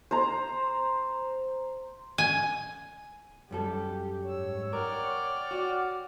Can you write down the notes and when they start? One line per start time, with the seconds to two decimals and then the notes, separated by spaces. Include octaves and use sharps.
0.11 C5 A#5
2.18 G#5
3.51 F#2 G3 G4 A4
4.28 G#2 C#5 E6
4.73 A#4 D5 F#5 G5 F6
5.51 F#4